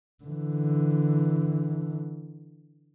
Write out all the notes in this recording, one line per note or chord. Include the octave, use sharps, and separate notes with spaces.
D3 E3